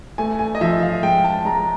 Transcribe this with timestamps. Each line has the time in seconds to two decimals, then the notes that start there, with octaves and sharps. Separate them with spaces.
0.18 A3 G#5
0.39 G#5
0.55 D#5
0.61 F3 E5
0.82 F5
1.03 G#3 G5
1.24 A5
1.45 G#3 A#5